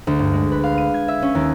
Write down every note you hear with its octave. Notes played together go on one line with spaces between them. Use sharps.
D2
G2
G#3
B4
F5
D#7
G#6
E5
C#4
D#2